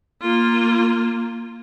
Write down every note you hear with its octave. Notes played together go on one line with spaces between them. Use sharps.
A#3 F4